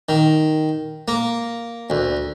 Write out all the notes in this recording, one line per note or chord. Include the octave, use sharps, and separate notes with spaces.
D#3
A#3
D2